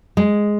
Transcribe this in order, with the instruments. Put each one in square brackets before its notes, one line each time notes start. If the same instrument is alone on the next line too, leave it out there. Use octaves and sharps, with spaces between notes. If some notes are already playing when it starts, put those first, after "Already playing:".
[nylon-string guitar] G#3